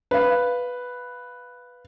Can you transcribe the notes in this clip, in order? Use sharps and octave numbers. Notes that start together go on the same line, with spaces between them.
B4 F5